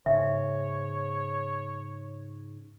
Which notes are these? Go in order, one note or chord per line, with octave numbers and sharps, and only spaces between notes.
G#2 C#3 C#5 E5